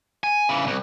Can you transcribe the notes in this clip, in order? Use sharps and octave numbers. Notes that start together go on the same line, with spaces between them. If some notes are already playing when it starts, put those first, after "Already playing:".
G#5
C#3 E3
C2 F#2